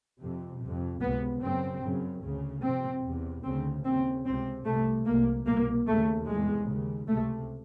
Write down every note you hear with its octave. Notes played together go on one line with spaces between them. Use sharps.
F2 C3
F2 C3
C#2 C3 B3
F#2 C#3 C4
F#2 C#3
D2 C#3
F2 C3 C4
E2 C3
D2 C#3 C4
D#2 C#3 C4
C#2 C3 C4
C2 C3 A3
C2 C3 A#3
C2 B2 A#3
D#2 C#3 A3
E2 C3 G#3
D#2 C#3
C#2 C3 A3